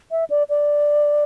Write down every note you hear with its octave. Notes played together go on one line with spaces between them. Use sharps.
E5
D5
D5